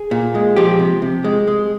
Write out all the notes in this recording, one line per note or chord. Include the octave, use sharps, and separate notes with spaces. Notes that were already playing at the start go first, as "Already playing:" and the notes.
Already playing: G#4
A#2
G#3
F3 G4
C3
C3
G#3
G#3